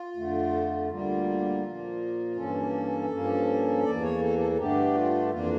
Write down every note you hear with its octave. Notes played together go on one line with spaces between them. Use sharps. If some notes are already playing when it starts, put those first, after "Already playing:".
Already playing: F4
F2 D3 A3
D2 D3 G3 A#3 F4
A#2 F3 A#3
G2 E3 A#3 C#4 A4
G2 F3 A#3 C#4
E2 E3 A#3 D5
C#5
A4
A4
A4
G2 D3 A3 D4 G4
F4
F2 E3 A#3 D4 F4